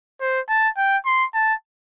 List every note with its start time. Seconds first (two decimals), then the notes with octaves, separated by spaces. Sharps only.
0.21 C5
0.49 A5
0.77 G5
1.06 C6
1.34 A5